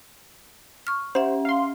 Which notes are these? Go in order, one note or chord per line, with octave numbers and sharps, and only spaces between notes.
C#6 F6
C#4 C5 E5 F#5
F5 C6